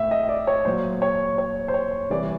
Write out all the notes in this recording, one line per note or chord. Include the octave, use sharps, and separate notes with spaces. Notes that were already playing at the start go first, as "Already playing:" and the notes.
Already playing: A2 E5
D#5
D5
C#5
A#2 F#3 C5
C#5
C#5
C5
C#5
C3 E3 G3 D5